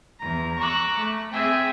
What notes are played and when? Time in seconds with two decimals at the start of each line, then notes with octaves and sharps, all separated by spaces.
0.18 E2 A#5
0.58 A#5 C#6 D6 E6 F#6
0.99 A3
1.32 C4 G#4 E5 G5 G#5